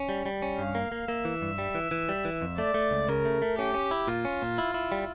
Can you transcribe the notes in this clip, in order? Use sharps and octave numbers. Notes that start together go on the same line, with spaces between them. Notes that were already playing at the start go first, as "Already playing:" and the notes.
Already playing: C#4
G3
G3
C#4
G2 F5
A#3
A#3
A#3 E5
E3
G2
G3
E3
E3
G3
E3
F2
A3 D5
A3
C#2
C#3 A#4
A3
A3
C#4 G4
C#4
E4
A#2 F4
C#4
A#2
E4
E4
G3